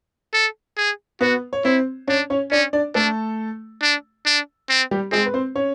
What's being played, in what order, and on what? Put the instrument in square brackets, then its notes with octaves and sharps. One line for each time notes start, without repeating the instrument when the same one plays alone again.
[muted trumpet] A4
G#4
[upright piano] B3 B4 [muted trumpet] F#4
[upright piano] C#5
[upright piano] C4 C5 [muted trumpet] E4
[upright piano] C#4 C#5 [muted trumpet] D4
[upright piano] C#4 C#5
[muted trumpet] C#4 [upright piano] D4 D5
[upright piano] D4 D5
[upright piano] A3 A4 [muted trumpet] D4
[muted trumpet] D4
D4
C4
[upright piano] G3 G4
[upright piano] G#3 G#4 [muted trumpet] C4
[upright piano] B4
C4 C5
C#4 C#5